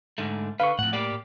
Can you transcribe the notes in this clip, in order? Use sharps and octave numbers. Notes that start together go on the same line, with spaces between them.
G#2 D3 A3
D3 B4 F5 C#6
F2 A2 F#5
A#3 G4 D5